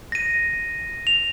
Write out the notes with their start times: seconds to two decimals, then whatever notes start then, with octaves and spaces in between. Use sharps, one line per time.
0.12 A#6 D#7
1.07 F7